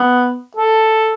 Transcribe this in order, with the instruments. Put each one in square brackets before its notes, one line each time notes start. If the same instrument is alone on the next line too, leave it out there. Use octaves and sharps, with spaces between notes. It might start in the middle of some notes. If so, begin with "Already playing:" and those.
Already playing: [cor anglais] B3
A4